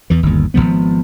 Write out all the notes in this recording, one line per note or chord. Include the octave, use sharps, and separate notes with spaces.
E2 E3
G1 D#2
G#1 F2 F3 B3